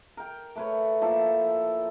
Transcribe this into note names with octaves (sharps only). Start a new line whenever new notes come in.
A#4 G5
A3 B4 C#5
F3 A#3 E4 A4